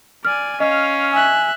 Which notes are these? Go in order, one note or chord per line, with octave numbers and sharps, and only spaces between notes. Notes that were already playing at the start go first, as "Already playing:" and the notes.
D5 G#5 F6
C#4 D#5 F5
E5 G#5 F#6